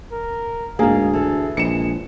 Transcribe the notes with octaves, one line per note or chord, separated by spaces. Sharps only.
A#4
D2 G#2 A#3 G#4 F5
E3 A4
A#1 G#3 C#7 E7